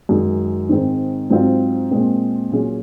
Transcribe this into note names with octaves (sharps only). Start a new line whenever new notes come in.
F#2 D#3 G#3
G#2 D#3 G#3 C4
G#2 F#3 C4 F4
A#2 G#3 C4
A#2 F#3 A#3 C#4 G#4